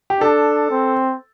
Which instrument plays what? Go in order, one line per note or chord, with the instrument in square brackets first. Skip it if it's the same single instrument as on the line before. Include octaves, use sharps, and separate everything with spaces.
[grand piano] G4
[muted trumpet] D4 [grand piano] A4
[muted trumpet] C4